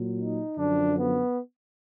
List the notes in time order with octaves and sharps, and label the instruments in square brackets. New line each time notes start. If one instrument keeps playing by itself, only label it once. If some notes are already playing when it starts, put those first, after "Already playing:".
Already playing: [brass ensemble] A#2 F#3
D#4
F#2 D3 F3 D4
B3